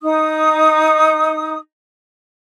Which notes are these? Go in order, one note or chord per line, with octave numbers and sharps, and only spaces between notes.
D#4 D#6